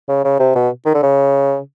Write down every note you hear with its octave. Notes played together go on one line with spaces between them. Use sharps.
C#3
C#3
C3
B2
D#3
D3
C#3